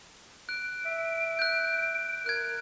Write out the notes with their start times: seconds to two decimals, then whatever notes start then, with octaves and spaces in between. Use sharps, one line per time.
0.49 F#6 D7
0.86 E5
1.39 F#6 G6
2.26 A#4 F#6 G#6